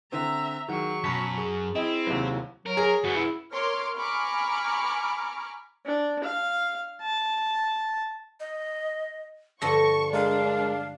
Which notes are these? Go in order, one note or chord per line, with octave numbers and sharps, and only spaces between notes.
D3 C4 E5 A#5
D#3 F#3 G#4 F#5 C#6
F#2 B2 A5 B5 B6
G#4
C4 E4 D#5
D#2 C3 F#3
F#3 A#4
G#4
F#2 B3 F#4
E4
A#4 C#5 C6 D6 F6
G#5 A#5 B5 C#6 D6 F6
D4
F5
A5
D#5
G2 D3 F3 A5 C#6 A#6
G#3 D4 A#4 F5